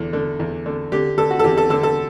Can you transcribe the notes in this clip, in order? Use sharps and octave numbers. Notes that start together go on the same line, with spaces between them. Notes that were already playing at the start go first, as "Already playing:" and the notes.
Already playing: E2 D3
D3
E2
D3
D3 G4
D3 A4
F#4
A4
E2 G4
A4
D3 A4
A4